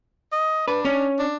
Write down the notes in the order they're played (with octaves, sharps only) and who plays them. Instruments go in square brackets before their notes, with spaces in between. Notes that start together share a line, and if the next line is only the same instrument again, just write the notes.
[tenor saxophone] D#5
[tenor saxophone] D4 [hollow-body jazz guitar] B4
[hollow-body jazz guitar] C#4
[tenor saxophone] D4